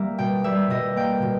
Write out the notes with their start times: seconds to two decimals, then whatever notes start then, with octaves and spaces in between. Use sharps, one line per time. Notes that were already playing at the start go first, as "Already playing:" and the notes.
Already playing: G3 A#3 E5
0.18 B2 G5
0.44 G3 E5
0.70 B2 D#5
0.96 A#3 G5
1.22 B2